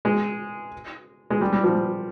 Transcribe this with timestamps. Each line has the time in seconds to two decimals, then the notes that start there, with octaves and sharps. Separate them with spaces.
0.05 G#3
1.30 G#3
1.41 G3
1.53 G3
1.64 F3
1.75 G3